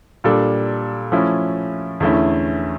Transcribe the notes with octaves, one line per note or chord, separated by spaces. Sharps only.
A#2 G3 D4 A4
F3 A3 C#4 E4
E2 D3 A3 C#4 E4